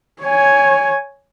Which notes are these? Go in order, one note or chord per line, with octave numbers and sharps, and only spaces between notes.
C#5 G#5